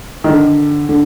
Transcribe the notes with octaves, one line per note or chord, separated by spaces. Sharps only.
D#3
D3
D3